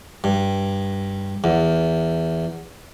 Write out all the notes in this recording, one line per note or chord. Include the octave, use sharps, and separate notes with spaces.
G2
E2